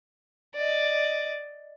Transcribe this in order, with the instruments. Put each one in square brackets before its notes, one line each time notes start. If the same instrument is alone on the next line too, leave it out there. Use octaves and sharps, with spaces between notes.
[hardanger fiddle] D5 D#5